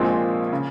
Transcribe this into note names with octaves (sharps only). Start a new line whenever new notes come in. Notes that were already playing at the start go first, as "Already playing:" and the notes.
Already playing: A#1 A#2 F3 G#3 C4
C#3